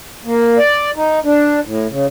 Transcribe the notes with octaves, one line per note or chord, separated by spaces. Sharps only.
A#3
D5
D#4
D4
A2
C#3